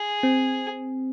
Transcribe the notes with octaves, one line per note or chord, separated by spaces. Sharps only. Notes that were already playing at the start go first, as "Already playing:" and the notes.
Already playing: G#4
C4